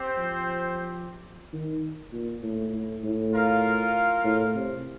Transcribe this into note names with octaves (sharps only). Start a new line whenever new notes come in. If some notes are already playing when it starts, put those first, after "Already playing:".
Already playing: C4 G4 C5
F3
D#3
A#2
A2
A2
A2
F4 A#4 F5
A2
C3